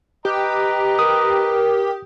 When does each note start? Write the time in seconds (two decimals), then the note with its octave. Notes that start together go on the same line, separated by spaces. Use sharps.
0.25 G4 B4 D#5 A#5
0.99 A#4 D#6